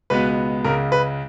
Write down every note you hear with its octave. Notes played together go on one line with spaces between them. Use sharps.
C#2 B2 G#3 B3 B4
C#2 C#3 G#3 A#4
B4